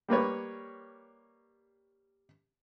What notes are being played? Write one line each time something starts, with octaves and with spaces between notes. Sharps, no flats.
G3 A#3 B4 C#5